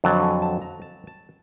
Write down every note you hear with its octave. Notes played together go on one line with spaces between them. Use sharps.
F2 D3 F#3 A5
G#5
A5
A#5
A5
A5